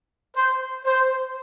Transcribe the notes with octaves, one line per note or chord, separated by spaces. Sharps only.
C5
C5